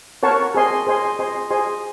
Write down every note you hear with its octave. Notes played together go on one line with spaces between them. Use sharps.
A#4 C#5 F#5 A5 C#6
G#4 C5 D#5 G#5 C6
G#4 C5 D#5 G#5 C6
G#4 C5 D#5 G#5 C6
G#4 C5 D#5 G#5 C6